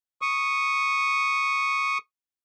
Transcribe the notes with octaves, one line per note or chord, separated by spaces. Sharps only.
C#6 D#6